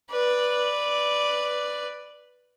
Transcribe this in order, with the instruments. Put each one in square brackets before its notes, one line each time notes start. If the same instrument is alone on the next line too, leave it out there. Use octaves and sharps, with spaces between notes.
[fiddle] B4 D5